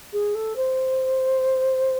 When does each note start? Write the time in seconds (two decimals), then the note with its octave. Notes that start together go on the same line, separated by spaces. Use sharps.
0.12 G#4
0.34 A4
0.56 C5